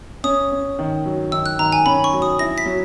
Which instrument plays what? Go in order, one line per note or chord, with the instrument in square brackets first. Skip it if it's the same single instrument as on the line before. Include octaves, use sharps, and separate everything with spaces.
[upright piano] C#4 [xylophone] D#6
[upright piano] C#4
D#3
F#3
[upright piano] D#3 [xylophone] E6
[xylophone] F#6
[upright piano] D#3 [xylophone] A#5
[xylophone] G#5
[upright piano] C#4 [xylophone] B5
[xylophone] C#6
[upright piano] F#3
[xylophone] D#6
[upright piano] E4 [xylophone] A#6
[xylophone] B6
[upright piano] F#3